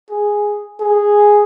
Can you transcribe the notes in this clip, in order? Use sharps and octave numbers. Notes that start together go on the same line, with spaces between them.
G#4
G#4